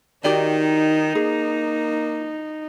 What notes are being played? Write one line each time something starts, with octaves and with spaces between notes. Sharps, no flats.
D#3 D#4 F#4 G4 D5
A#3 G#4